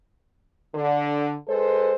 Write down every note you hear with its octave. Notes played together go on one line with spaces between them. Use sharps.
D3
G#3 A4 B4 C5